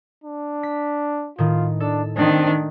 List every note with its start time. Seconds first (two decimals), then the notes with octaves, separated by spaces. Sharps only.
0.24 D4
0.63 B6
1.38 A2 D#3 F4
1.80 D4 A4
2.17 D#3 G#3 A3 C4 D4 D#4